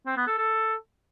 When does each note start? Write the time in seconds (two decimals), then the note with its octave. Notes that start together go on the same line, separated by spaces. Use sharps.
0.06 C4
0.17 B3
0.27 A4
0.38 A4